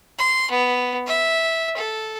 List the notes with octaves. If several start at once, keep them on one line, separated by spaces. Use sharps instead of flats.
C6
B3
E5
A4